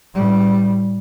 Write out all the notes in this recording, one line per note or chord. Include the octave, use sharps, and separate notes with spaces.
A2 G3